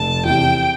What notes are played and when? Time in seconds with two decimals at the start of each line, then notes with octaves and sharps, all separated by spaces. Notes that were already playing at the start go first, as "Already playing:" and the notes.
Already playing: F1 A5
0.25 E2 C3 G5